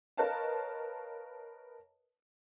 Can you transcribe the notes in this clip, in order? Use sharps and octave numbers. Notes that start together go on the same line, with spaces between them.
A#4 B4 C#5 D#5 F5 A5